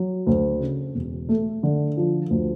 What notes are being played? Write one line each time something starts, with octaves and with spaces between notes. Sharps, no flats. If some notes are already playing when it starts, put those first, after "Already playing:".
Already playing: F#3
D2
C#3
E1
A3
D3
F3
D2